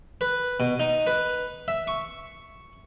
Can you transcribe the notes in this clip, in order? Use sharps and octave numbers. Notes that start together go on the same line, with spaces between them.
B4
B2
D#4
B4
E5
C#6